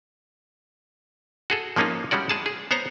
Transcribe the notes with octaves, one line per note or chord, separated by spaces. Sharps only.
F#4 G#4 A4
F3 G#3 A#3 C#4 D#4 F4
G3 G#3 C#4 F#4 D5
G#3 G#4 A5
G#4
B3 C5 C#5 A#5